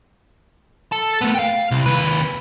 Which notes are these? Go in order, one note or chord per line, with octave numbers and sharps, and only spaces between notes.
A4 A5
A3 B3
F5 G5
C2
D#2 B4